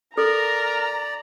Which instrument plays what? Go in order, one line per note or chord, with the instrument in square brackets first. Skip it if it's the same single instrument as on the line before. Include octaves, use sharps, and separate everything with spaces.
[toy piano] A4 [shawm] A#4 [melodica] D5 [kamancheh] A#5